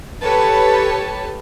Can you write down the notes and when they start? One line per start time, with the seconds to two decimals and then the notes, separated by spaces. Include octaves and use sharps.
0.22 G4 A4 B4 C#5 A5